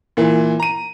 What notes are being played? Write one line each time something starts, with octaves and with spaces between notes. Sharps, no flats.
A#2 E3
A#5 D#7